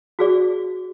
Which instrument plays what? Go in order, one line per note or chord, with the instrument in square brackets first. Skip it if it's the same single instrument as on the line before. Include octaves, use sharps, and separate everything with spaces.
[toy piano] F#4 G#4 D5